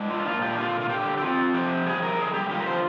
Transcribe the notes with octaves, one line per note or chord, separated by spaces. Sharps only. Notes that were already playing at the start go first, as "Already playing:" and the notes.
Already playing: G#3 D4
F4
A#2 F4
G4
D3 F4
F4
D3 G4
G4
C4 F4
F3 G4
G3 G#4
A#4
D3 G#4
G4
F4 G4
A#4
C5